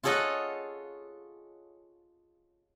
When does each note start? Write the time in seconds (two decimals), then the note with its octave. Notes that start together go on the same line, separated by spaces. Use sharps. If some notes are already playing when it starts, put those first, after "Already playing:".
0.03 F4 G#4 A4 C#5 D#5 F#5